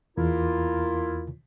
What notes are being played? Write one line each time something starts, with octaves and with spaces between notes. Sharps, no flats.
E2 A#3 E4 F4